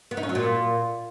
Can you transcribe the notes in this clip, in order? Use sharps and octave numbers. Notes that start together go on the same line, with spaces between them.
B3
D#4
C#4
F#3
A#2